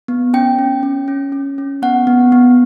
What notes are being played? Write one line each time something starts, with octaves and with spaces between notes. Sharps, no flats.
B3
C#4 G5
C#4
C#4
C#4
C#4
C#4
B3 F#5
B3
B3